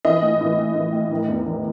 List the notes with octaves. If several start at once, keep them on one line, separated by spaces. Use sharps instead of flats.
E3 D#5
A2
E3
A2
E3
A2
D#3
E2
D#3